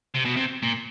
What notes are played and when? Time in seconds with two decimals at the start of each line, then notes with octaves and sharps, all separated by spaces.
0.15 C3
0.25 B2
0.37 C3
0.63 A#2